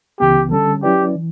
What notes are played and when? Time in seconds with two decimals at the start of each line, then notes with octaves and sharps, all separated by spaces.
0.20 C#2 C#3 E3 B3 G4
0.52 D3 G3 C#4 A4
0.83 F#3 C#4 E4 G4 B4 D5
1.16 E3